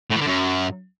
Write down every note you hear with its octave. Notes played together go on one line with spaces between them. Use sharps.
A2
E3
D3
F#2